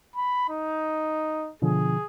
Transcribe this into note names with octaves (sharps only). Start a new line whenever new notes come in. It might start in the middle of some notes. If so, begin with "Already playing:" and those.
B5
D#4
B2 D3 F3 G#4